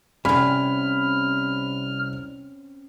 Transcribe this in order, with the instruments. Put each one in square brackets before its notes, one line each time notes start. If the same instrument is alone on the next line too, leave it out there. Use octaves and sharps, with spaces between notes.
[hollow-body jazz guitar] C2 F2 [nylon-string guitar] C4 C#4 G#5 [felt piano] B5 [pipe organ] F6